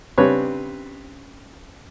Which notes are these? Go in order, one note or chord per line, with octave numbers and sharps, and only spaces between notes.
C#3 G3 C4 D4 B4 C#5